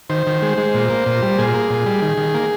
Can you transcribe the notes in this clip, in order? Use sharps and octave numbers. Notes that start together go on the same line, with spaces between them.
D#3 C5
D#3
G#3
G#3
A#2
A#3
A#2
G3
A#2 G#4
A#3
A#2
G3
D#3
D#3
A#3